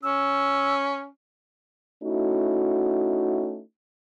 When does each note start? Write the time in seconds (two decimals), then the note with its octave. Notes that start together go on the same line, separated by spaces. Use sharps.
0.03 C#4 E6
2.03 A3 C#4 D#4 E4 F#4